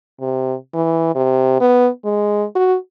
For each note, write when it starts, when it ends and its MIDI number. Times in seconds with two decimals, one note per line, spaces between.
0.20 0.54 48
0.74 1.12 52
1.15 1.60 48
1.60 1.88 59
2.05 2.44 56
2.55 2.75 66